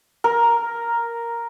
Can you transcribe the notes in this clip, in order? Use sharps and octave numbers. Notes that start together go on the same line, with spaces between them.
A#4